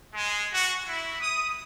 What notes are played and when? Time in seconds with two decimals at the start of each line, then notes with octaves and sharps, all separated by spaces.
0.14 G#3
0.52 F#4
0.87 E4
1.21 D#6